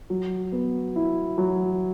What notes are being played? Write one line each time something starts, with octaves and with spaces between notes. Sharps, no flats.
F#3
B3
E4
F#3